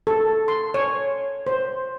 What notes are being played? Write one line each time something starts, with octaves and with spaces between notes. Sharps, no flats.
A4
C6
C#5
C5